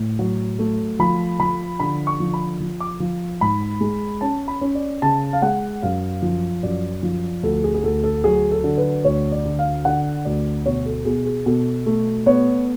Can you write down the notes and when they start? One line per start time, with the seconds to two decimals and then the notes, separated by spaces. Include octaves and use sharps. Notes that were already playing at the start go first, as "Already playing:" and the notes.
Already playing: A2
0.19 F#3
0.59 A3
0.99 F3 B5
1.39 F3 B5
1.80 D3 B5
2.07 C#6
2.20 F3
2.34 B5
2.60 F3
2.80 D6
3.00 F3
3.41 G#2 B5
3.81 G#3
4.21 C#4 A5
4.48 B5
4.61 C#4
4.75 D5
5.02 C#3 A5
5.33 F5
5.42 G#3 F#5
5.82 F#2 F5
6.22 F3
6.63 F#2 D5
7.03 F3
7.43 D2 A4
7.64 G#4
7.74 G#4
7.83 D2 A4
8.04 A4
8.24 F#3 G#4
8.51 A4
8.64 D3
8.78 B4
9.04 D2 C#5
9.32 D5
9.45 D3
9.59 F5
9.85 D3 F#5
10.25 D2 D5
10.66 B2 C#5
10.86 A4
11.05 B2 G#4
11.26 G#4
11.46 B2 A4
11.86 A3
12.26 B3 C#5